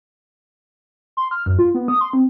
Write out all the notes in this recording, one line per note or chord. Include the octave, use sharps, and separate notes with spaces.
C6
F6
F#2
F4
B3
D#6
C6
C4